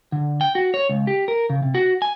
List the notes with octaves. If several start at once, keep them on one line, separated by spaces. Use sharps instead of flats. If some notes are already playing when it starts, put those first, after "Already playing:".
D3
G5
F#4
C#5
C#2
G4
A#4
C#3
C3
F#4
G#5